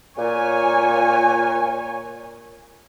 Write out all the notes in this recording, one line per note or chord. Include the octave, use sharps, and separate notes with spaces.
A#2 C#5 G#5